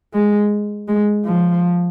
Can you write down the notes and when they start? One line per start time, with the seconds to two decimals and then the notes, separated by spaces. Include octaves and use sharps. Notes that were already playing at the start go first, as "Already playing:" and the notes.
0.14 G#3
0.88 G#3
1.25 F3